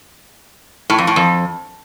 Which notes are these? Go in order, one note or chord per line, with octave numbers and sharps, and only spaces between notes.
A2
F2
A2
F2